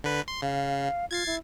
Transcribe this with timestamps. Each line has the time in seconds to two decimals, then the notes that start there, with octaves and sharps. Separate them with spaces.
0.04 D3 B4
0.28 C6
0.42 C#3 F5
1.11 F4 G#6 A6 C7
1.26 E4